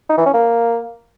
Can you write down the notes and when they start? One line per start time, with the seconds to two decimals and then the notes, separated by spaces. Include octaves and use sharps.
0.10 D#4
0.18 E3
0.26 C#4
0.34 A#3